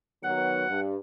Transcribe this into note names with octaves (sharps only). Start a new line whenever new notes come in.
D#3 F#3 B3 F#5
G2